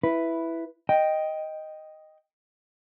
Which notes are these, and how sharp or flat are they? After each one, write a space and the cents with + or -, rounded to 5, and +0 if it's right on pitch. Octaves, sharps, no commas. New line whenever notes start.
E4 +5 B4 +0
D#5 +0 G5 +0